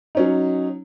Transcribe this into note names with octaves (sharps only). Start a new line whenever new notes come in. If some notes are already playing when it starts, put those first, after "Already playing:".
F#3 C#4 D#4